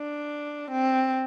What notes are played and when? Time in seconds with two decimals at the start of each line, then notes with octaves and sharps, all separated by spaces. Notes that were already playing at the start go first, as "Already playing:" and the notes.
Already playing: D4
0.71 C4